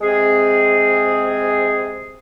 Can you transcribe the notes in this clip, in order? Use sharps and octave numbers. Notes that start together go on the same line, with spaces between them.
C3 G#3 C4 G#4